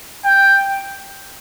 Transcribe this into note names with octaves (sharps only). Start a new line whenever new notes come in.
G5